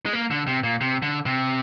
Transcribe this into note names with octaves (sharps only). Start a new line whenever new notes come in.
G#3
A#3
D3
C3
A#2
C3
D3
C3